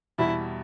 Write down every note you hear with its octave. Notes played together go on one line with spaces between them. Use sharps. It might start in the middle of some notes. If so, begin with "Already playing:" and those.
E2 B2 G3 E4